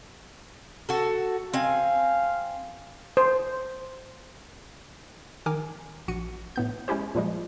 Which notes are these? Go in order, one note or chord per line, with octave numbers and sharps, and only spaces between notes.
F#4 A4
C4 F5 G#5
C5
D#3 A#4 G#5 D6
A#1 F#4 C#7 D#7
A2 B3 G6
G#3 C#4 E4 G4 C5
A#2 F3 G3 G#3